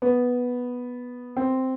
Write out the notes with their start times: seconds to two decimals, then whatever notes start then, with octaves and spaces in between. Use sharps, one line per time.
0.02 B3
1.37 C4